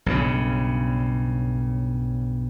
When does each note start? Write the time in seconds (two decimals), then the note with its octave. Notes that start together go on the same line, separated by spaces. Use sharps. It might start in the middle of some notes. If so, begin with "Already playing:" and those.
0.06 B1 G2 C#3